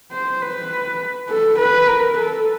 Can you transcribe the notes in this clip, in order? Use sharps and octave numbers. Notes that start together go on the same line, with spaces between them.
C5
B4
A4
B4
A#4
A4